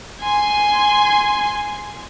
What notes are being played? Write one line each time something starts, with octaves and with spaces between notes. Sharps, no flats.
G#5 C6